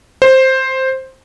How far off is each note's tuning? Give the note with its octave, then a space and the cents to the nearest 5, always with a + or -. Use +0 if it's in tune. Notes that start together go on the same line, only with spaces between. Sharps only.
C5 +5